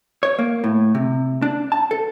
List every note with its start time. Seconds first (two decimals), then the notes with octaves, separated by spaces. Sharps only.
0.23 C#5
0.39 A#3
0.64 A2
0.95 C3
1.42 D4
1.72 A5
1.91 A4